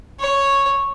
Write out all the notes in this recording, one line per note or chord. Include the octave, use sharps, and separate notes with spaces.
C#5